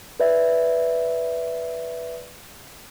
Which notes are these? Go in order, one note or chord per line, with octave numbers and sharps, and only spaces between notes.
B4 D5 E5